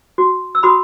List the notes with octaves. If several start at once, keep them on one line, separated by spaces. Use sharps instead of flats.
F#4
E6
F#4 B5 D#6